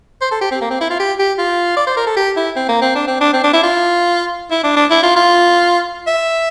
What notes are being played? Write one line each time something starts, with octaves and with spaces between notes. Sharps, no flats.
C5
A4
G4
C4
A#3
C4
E4
F4
G4
G4
F4
D5
C5
A#4
A4
G4
E4
C4
A#3
C4
D4
C4
D4
C4
D4
E4
F4
E4
D4
D4
E4
F4
F4
E5